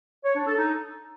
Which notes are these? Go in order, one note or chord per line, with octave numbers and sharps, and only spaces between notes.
C#5
D4
A4
D#4